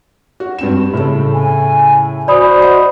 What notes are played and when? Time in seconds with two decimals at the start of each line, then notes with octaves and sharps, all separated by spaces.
0.40 F#4
0.58 G2 C4 E7
0.93 A2 C#3 A4
1.33 G#5
2.28 F#4 C5 D5 B5 D#6
2.62 D#5